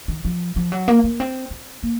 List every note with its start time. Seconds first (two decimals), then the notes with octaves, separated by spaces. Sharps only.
0.08 D#3
0.25 F3
0.56 F3
0.72 F#3
0.88 A#3
1.04 A#3
1.20 C4
1.50 C4
1.83 A#3